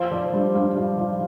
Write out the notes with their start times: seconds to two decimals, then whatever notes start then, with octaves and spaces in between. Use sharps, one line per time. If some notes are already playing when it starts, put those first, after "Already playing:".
Already playing: F3 C5
0.12 F3 D5
0.33 G2
0.55 G2 F5
0.77 F3
0.99 F3